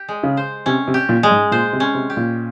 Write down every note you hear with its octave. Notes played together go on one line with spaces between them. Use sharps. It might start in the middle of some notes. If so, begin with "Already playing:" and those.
Already playing: G4
G#3
C#3
C5
C3 C#4
C3
G4
A#2
G#3
G#2
A#2 C5
C3
C#4
C3
G4
A#2